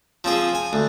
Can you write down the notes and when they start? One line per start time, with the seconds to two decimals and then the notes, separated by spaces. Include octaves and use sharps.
0.24 F3 C4 G#4
0.55 G#5
0.73 D2